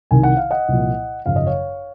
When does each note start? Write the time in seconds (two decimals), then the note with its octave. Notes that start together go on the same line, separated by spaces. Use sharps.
0.11 C2 C3 D#3 G#5
0.23 F#5
0.37 F5
0.51 D#5 F#5
0.68 C2 A#2 F3
1.26 G#1 F#2 C#3 F3 F5
1.36 D#5
1.47 C#5 F5